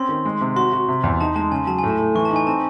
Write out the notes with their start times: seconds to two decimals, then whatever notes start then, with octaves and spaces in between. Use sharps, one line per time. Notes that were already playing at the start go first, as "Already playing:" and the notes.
Already playing: C4 C#4 C6
0.09 D#3
0.25 G#3
0.41 C3
0.56 F#4 C6
0.73 F#4
0.88 C3
1.04 E2
1.21 D#4 A5
1.36 G#3 A5
1.52 C#3 G#5
1.67 F#3 A5
1.79 G#5
1.84 A2
1.90 A5
1.99 A2
2.15 E3 C#6
2.25 A5
2.30 D#4
2.36 G#5
2.46 C4 A5